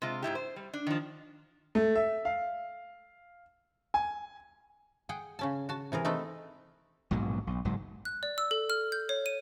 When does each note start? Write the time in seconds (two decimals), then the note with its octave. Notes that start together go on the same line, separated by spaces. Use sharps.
0.02 C3 G#3 F4
0.22 G#2 B2 E4 G4
0.35 C5
0.56 G3
0.73 D4
0.87 D#3 F3
1.75 A3
1.95 E5
2.25 F5
3.94 G#5
5.09 G#4 F#5 G5
5.39 C#3 C#4 A5
5.69 F#4 A5
5.92 C3 E3 G#4 A#4
6.05 A3 C4 D#4 A4 B4
7.11 A#1 G#2 B2 F#3
7.47 B1
7.65 F#1 G#2 F#3
8.05 F#6
8.23 D5
8.38 E6
8.51 A4
8.70 F6
8.92 G6
9.09 C#5
9.26 D#7